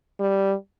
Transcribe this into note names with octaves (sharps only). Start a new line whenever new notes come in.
G3